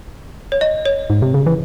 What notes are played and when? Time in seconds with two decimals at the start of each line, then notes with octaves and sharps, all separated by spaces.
0.52 C#5
0.61 D#5
0.86 C#5
1.10 G#2
1.22 C3
1.34 C#3
1.46 E3